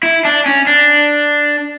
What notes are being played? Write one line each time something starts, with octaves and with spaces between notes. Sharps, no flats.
E4
D4
C#4
D4